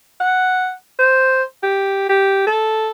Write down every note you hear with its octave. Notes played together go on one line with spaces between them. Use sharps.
F#5
C5
G4
G4
A4